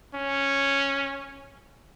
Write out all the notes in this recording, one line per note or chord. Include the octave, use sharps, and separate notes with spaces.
C#4